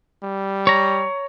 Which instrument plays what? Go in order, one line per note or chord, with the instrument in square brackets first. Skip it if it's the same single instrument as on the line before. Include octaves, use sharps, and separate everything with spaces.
[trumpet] G3
[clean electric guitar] C#5 A#5